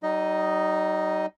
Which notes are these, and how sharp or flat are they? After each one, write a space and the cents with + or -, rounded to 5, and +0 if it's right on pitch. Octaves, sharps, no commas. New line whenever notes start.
G3 -40 D#4 +0 D#5 +0